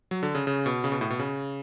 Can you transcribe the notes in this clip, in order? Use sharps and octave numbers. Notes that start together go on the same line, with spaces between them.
F#3
D3
C#3
C#3
B2
C#3
B2
A2
B2
C#3